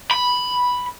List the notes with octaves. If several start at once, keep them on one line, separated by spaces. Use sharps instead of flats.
B5